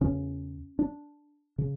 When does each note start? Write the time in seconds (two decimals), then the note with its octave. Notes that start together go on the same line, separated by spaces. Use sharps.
0.01 E2 C#3 C#4
0.79 D4
1.58 C#3